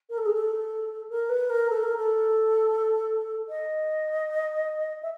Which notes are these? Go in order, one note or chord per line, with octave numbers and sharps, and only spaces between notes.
A#4
A4
G#4
A4
A#4
B4
A#4
A4
A#4
A4
D#5
E5